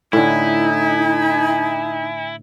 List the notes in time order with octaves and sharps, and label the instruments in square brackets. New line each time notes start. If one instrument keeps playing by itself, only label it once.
[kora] A2 D3 [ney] D#4 [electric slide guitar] E4 [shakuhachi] G#5